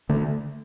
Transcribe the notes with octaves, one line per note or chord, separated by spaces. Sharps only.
D3 A3